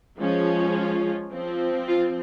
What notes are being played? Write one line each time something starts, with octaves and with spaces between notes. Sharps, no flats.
F3 G#3 C#4
F4
F3 C4
F4